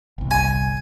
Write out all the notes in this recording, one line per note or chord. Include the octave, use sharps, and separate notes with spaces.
G1 C2
G#5